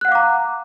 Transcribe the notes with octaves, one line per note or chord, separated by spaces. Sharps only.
F5 F#5 A#5 D6 F#6